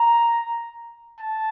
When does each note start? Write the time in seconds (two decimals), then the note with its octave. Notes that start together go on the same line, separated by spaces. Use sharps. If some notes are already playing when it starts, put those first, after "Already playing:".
Already playing: A#5
1.20 A5